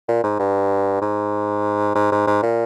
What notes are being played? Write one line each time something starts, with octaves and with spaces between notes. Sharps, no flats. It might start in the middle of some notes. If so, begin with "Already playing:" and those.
A#2
G#2
G2
G#2
G#2
G#2
G#2
A#2